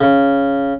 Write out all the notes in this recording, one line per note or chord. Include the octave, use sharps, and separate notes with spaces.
C#3